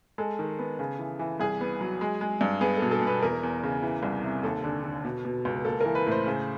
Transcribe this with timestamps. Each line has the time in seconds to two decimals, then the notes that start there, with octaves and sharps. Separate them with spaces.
0.18 G#3 A4
0.39 D#3
0.59 B3
0.79 C#3
0.99 E3
1.19 E3
1.40 C2 G#4
1.61 B3
1.81 F#3
2.01 G#3
2.21 G#3
2.41 G2
2.61 B3 G#4
2.77 A4
2.82 B2
2.91 A4
3.02 B2 B4
3.22 E2 A#4
3.43 E2
3.63 C#3
3.83 E3
4.03 C2
4.23 C3
4.43 D#2 A4
4.64 D3
4.84 D3
5.05 B2
5.25 B2
5.45 C#2
5.65 A#3 A4
5.81 E3 A#4
5.95 B4
6.06 A2
6.12 C5
6.26 C#3